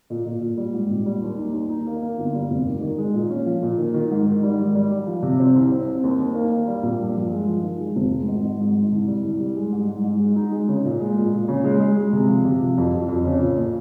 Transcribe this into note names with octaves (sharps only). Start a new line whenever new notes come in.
A#2
A#2
A#2
G3
G#2
A#1
G3
D#2
D#4
D#2
D#4
A#3
A#3
G1
G3
F1
D#3
D#3
G#3
A#2
C#4
F3
A#2
D#3
D#3
G#2
D#3
G3
G#2
G3
G3
F3
C3
C4
C2
C4
C4
D#2
D#2
A#3
A#3
G3
A#1
G2
F3
G#3
F3
D#3
G#3
F1
G#3
G#1
G#1
G#2
G#2
C2
G3
C2
G3
G#3
G#2
G#2
G#2
G#3
D#4
G#3
C#3
A#2
G#3
A#2
A#2
C#3
G#3
G#3
G#3
C3
F3
C3
F3
F2
F2
F2
C#3
A#2
A#2